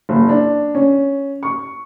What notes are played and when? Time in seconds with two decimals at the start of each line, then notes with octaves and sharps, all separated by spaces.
0.09 F#1
0.29 D4
0.75 C#4
1.43 C#6